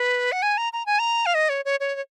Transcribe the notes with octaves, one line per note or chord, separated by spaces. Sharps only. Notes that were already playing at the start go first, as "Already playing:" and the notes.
Already playing: B4
F#5
G#5
A#5
A#5
G#5
A#5
F5
D#5
C#5
C#5
C#5
C#5